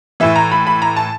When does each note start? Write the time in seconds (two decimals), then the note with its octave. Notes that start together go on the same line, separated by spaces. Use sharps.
0.20 A2 E3 E5
0.36 A#5
0.52 B5
0.67 B5
0.82 A#5
0.97 A5